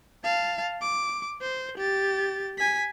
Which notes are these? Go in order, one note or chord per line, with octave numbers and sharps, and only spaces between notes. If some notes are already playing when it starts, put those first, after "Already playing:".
F5 A5
D6
C5
G4 A6
G#5 B6